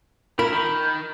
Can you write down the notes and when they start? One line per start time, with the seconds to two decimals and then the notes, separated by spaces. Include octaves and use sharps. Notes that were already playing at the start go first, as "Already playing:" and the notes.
0.39 E4 F4 A#4 B5
0.53 D#3 B5